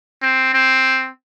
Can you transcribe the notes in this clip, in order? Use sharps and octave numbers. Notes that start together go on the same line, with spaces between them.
C4
C4